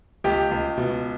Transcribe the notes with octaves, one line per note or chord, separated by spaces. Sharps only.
C#2 G4 G5
C#2
B2